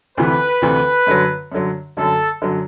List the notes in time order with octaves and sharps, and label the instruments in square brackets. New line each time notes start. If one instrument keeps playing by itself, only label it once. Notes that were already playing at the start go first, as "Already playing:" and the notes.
[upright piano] D2 C3 E3 [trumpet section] B4
[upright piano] D2 C3 E3
F#2 D3 F#3
F#2 D3 F#3
[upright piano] F#2 D3 F#3 [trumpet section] A4
[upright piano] F#2 D3 F#3